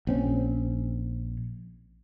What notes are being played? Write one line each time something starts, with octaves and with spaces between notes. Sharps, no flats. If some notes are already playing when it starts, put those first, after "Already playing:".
A#1 C4 C#4